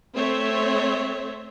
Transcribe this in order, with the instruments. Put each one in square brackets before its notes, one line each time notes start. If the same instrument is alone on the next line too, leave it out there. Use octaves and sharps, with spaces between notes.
[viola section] A3 C4 C5 C#5 E5